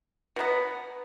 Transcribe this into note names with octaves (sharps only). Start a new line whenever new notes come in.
B2 F#3 B3